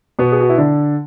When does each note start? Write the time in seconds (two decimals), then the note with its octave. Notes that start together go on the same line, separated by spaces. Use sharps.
0.19 B2 B3
0.32 G#4
0.41 F#4
0.50 E4
0.58 D3 D4